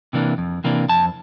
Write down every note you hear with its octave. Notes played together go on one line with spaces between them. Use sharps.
C3 E3 A#3 D4
F2
C3 E3 A#3 D4
F2 A5